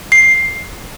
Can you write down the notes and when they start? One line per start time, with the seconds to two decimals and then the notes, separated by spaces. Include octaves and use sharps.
0.12 C7